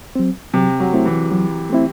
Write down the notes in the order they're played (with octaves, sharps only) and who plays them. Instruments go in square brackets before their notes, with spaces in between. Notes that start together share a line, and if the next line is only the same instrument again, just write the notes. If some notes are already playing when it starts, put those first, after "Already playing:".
[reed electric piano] F#3 C4
[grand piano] C3 [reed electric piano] F#3
[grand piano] F#3
[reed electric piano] A3 C4 E4
[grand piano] E3
[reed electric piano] F#3
A3 C4 E4